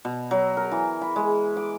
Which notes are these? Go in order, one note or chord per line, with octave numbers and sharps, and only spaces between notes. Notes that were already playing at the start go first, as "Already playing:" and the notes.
B2
F#3
A#4
E3
B5
G#3
D6